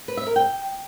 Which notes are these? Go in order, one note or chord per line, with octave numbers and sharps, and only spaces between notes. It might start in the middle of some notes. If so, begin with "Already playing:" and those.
B4
E5
A#4
G5